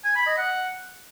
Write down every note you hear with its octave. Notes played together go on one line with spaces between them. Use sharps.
G#5
B5
D#5
F#5